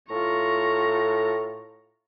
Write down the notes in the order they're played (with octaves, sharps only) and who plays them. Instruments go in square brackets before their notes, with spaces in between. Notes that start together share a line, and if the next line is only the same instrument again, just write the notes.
[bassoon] A2 [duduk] F4 [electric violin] A#5 C#6